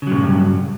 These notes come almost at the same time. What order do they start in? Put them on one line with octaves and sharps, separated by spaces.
C#3 F#3 A#2 G2